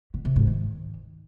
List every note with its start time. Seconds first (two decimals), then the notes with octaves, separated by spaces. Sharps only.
0.14 B2
0.25 C3
0.36 G#2
0.47 D#3